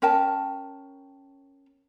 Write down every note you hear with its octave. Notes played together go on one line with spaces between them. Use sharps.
C#4 A#4 G5 A5